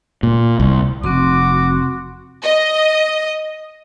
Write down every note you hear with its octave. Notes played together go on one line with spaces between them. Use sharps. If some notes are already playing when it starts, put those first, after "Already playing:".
A#2
C2
F1 C4 F#4 C6 D6
D#5